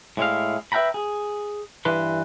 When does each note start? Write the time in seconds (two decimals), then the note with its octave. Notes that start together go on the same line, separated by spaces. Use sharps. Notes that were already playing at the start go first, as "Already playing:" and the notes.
0.17 A2 G#3 E4 F5
0.72 B4 E5 F5 G5 A#5 B5
0.94 G#4
1.85 G2 E3 B4 C6